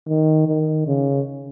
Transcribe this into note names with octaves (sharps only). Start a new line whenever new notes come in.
D#3
D#3
C#3